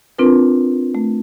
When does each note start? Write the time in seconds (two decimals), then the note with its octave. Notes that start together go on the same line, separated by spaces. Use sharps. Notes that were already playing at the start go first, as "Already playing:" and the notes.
0.18 C4 D4 F4 A#4 B4
0.95 A3